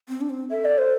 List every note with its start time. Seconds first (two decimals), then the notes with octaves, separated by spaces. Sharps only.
0.09 C4
0.21 D4
0.30 C4
0.50 A4 E5
0.64 D5
0.78 C5